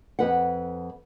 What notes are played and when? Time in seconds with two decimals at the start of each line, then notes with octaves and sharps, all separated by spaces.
0.19 F2 B4 F#5